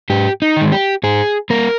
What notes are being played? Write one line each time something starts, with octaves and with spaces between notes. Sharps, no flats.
G#2 G4
D#4
D#3 G#3
G4
G#2 G#4
G3 A#3 A#4